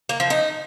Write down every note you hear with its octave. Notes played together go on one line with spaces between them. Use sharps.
A#3
F3
D#4